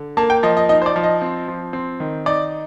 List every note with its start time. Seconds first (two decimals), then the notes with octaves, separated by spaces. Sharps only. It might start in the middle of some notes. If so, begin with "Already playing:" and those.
Already playing: D3
0.17 A#3 A5
0.30 G5
0.43 F3 D#5
0.57 D#5
0.69 D#4 D#5
0.82 C5
0.86 D5
0.96 F3
1.03 D#5
1.22 C4
1.48 F3
1.73 C4
2.00 D#3
2.26 D#4 D5